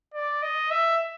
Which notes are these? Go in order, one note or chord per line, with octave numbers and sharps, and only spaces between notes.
D5
D#5
E5